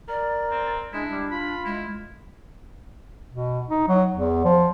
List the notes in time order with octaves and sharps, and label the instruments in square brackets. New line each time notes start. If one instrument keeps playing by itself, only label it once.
[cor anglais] A#4 [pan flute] D5
[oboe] C4
[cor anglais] G#3 [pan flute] D4 [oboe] E4
[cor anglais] G3
[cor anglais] F4 [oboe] B5
[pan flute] G#3 [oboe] E4
[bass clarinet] B2
D#4
F#3
E2
F3